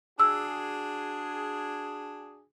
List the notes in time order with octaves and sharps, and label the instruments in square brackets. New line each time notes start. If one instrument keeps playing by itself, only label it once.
[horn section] D4 F#4 G#4 [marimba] E6